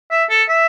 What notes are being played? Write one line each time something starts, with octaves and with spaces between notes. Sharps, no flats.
E5
A4
E5